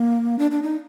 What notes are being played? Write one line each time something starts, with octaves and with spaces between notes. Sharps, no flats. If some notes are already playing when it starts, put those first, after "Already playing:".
Already playing: A#3
D4
D4
D#4